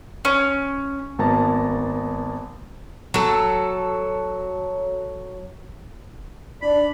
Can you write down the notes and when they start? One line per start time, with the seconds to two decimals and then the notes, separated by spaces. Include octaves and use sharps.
0.25 C#4
1.19 G#1 A#3 B3 A5 A#5
3.14 F#3 A4
6.62 D4 B5